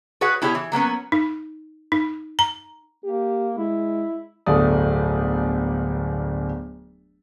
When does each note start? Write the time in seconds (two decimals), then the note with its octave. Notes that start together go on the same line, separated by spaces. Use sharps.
0.21 F#4 G#4 B4 C#5 F#5
0.42 B2 E4 G4 G#4 C#5
0.55 E3
0.72 F#3 A#3 B3 C#4
1.12 D#4
1.92 D#4
2.39 A#5
3.04 A#3 G4
3.57 G#3 E4
4.46 D1 G1 A3 D5 D#6